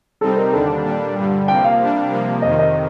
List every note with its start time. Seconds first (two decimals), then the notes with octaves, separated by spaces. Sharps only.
0.21 C3 G3 C4 D#4 A4
0.37 A#4
0.52 D#2 D3 G3 D4 A4
0.84 A#2 G3 D4
1.16 G2 D3 G3
1.48 C3 F3 A#3 G5
1.64 F5
1.80 C3 G3 D4
2.11 C3 F3 A#3
2.42 F2 C3 D#3 D#5
2.59 D#5